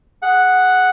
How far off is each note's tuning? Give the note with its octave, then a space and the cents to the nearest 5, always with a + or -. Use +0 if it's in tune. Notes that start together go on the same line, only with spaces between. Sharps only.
G#4 +0 F#5 +0